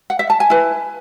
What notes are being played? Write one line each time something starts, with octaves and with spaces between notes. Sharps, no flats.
F#5
E5
A5
G#5
E4 B4